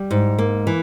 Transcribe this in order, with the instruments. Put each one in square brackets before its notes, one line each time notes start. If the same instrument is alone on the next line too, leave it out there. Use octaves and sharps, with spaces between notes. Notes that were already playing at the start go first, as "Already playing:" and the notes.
Already playing: [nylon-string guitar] G3
G#2
A#3
E3